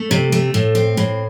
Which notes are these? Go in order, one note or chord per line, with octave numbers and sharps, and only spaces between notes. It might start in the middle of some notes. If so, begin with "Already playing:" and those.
Already playing: A3
C3
A3
A2
C4
A2